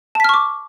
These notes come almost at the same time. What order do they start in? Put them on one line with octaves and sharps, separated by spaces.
A5 B6 F6 C#6 D6